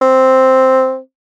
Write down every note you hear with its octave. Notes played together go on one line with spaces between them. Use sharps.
C4